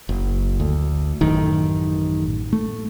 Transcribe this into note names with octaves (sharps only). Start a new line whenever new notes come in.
F#1
D2
A1 F#2 A2 D#3
A3